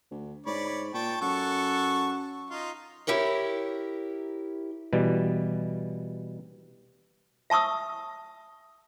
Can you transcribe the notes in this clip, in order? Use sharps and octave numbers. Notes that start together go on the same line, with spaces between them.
D2
G#2 C#5 D5 B5
A#2 G5 A5 C#6
F#2 A4 F#5 C#6
D#4 F4
E4 G4 A#4 C#5
B2 E3 G3
E5 A5 C#6 D#6 E6